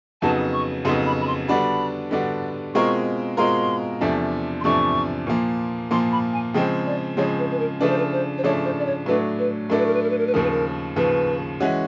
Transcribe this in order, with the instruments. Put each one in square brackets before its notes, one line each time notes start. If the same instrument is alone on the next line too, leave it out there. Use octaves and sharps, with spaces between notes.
[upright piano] F2 C#3 F#3 B3 D#4 [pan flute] A5
[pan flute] C#6
[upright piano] F2 C#3 F#3 B3 D#4 [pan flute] C6
[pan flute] B5
B5
C6
[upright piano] D3 G3 B3 D4 F#4 [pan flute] B5
[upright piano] D3 G3 B3 D4 F#4
[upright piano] B2 G#3 C4 F4 A#4 [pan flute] C#6
[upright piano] B2 G#3 C4 F4 A#4 [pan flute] C6
[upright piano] E2 C3 F3 A3 D4
[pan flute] C6
[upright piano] E2 C3 F3 A3 D4 [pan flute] C#6
[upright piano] A#2 F3 A#3
[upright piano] A#2 F3 A#3 [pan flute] C6
[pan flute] B5
G#5
[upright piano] C#3 F3 G#3 C4 [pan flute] G5
[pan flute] D5
[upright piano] C#3 F3 G#3 C4 [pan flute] C#5
[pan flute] B4
B4
A#4
[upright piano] C#3 F3 A3 D4 [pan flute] B4
[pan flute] C5
B4
C5
C5
[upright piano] C#3 F3 A3 D4 [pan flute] C#5
[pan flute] C5
D5
C#5
[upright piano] A2 F#3 A3 D4 [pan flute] B4
[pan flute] B4
[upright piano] A2 F#3 A3 D4 [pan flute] A#4
[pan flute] B4
A#4
B4
A#4
B4
A#4
B4
[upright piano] D#2 C#3 F3 [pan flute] A#4
[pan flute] B4
A#4
[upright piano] D#2 C#3 F3 [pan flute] B4
[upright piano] E3 G#3 C#4 F#4